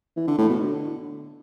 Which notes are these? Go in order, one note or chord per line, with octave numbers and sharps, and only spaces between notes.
E3
D3
A2
B2
D3